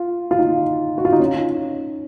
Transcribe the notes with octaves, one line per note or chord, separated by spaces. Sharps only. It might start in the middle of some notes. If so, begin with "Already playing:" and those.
Already playing: F4
F4
D#4
F#4
F4
D#4
C#4